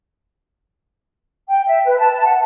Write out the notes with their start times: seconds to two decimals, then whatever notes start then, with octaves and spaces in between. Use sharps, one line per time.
1.49 G5
1.66 E5
1.84 B4
1.97 A5
2.24 F#5